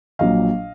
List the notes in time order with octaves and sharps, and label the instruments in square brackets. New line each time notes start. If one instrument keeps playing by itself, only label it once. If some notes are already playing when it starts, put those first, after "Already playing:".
[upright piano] A#1 A#2 F#3 D#5 F5